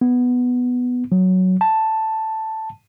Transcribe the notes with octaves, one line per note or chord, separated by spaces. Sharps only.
B3
F#3
A5